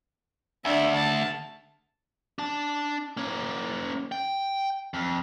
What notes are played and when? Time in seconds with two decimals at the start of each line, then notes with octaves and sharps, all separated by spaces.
0.65 D2 D4 E5
0.95 A5
2.39 D4 A5
3.17 A#3 C#4
4.12 G5
4.94 F2